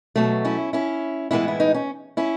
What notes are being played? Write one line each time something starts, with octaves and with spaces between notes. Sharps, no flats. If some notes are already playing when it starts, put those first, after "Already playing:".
B2 F#3 A3
C#4 E4
C#4 E4
A2 E3 G#3 B3 C#4 E4
E4
D#4
C#4
C#4 E4